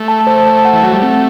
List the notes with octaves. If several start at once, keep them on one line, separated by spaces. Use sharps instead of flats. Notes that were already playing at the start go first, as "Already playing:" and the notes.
Already playing: A3
A5
C5
A5
F#5
E3
F#3 F#5
G3
A3 C4